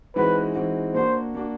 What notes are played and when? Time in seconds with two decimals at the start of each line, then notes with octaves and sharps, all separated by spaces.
0.16 E3 G#3 C4 D#4 F#4 B4
0.55 E3 G#3 C4 D#4 F#4
0.94 A#3 D4 F#4 C5
1.35 A#3 D4 F#4